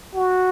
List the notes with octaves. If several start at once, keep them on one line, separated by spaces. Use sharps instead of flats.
F#4